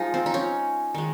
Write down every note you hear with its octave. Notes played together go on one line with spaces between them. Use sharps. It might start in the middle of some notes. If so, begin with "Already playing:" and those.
Already playing: F3 G#3 D#4 F4
C4
D#4
C#4
D#3 G#3